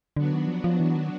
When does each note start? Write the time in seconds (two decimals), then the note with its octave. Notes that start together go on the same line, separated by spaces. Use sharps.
0.17 D3 F#3 B3 D4 F#4
0.32 D#3
0.48 F3
0.64 F3
0.80 E3
0.96 D#3